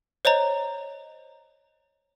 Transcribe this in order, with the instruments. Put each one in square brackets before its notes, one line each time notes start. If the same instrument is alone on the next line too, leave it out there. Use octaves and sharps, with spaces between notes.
[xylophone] C5 C#5 D#5 A#5